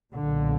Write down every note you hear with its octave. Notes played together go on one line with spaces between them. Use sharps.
B1 A#2 D3